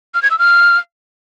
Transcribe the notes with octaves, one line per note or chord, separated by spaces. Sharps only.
F6
G#6
E6
F6